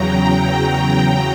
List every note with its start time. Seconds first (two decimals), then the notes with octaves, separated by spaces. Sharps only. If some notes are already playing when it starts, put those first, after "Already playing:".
Already playing: E2 C#3 F#3 G5 A#5
0.19 G5
0.52 G5
0.84 A#5